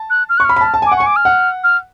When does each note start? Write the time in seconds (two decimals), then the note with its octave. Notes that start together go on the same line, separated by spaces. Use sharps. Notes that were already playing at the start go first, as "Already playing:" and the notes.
Already playing: A5
0.10 F#6
0.29 F6
0.37 C#6 F#6
0.45 B5 F6
0.56 B5
0.61 A5
0.74 A5
0.82 G#5
0.86 D6
0.92 F#5
0.97 C#6
1.00 G#5
1.06 D6
1.16 F6
1.25 F#5
1.64 F6